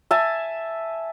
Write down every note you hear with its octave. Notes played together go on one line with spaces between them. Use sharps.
E5 G#5 A5